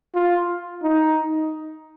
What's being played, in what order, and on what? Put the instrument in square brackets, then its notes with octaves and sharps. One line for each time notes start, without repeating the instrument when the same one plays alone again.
[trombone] F4
D#4